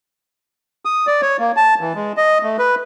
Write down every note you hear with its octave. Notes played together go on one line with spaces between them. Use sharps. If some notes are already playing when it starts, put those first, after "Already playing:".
D#6
D5
C#5
A#3
A5
E3
G#3
D#5
A3
B4